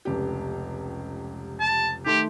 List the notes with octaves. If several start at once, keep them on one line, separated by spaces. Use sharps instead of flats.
F1 C#2 G4
A5
D#3 A3 G4 C6